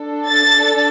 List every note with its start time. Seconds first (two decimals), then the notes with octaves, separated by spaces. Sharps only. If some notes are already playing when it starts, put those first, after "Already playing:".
Already playing: D4 A4
0.29 A6